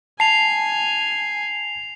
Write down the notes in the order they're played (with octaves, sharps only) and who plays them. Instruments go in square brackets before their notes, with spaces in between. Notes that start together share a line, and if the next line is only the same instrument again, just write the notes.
[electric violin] G#5 [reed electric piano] A5 [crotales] C7 F7